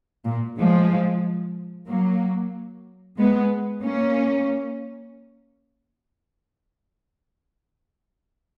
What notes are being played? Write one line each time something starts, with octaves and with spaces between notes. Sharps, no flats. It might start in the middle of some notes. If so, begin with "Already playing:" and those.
A#2
F3 G#3
F#3 A#3
G#3 B3
A#3 C#4